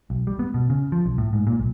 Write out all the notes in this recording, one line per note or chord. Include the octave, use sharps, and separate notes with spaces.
B1
G3
B3
B2
C#3
F3
B1
A2
G#2
A#2
B1